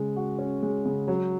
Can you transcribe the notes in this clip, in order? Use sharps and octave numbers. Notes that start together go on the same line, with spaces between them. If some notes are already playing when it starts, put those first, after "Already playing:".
Already playing: C#3 G#3
F#4
C#4
G#3
C#3
F#3